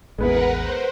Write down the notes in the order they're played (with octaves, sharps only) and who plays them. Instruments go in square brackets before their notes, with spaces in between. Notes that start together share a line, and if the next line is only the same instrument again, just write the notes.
[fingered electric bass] A1 E2 [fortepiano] G#3 B3 E4 [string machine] A#4 B4 F#5
[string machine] C5